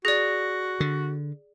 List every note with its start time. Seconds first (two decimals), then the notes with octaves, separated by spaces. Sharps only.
0.05 F#4 G#4 D5 A#6
0.80 D3